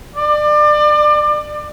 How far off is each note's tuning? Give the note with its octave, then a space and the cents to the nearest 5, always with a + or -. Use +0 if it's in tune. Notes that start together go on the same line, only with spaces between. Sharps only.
D5 +30